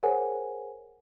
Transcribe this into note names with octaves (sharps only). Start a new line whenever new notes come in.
G#4 A#4 C5 C#5 F#5 G#5